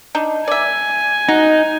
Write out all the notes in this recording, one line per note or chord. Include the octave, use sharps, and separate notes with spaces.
D4 D#4
D5 E5 G#5
D#4 F#4